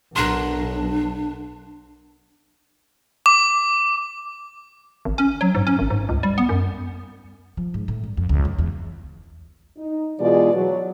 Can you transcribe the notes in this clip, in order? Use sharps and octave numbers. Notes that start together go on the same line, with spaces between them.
B1 D4 A#4 F#5 C6
D6
G#1
C#4
F#3
G#2
C#4
G#1
G#2
C#2
G3
B3
F#2
F3
G#2
A2
G2
F2
C#2
F2
E2
D#4
B2 E3 G#3 F4 G#4 D5
F#3